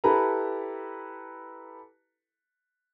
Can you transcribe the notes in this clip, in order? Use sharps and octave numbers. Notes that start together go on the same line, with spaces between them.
E4 G4 A4 B4 A#5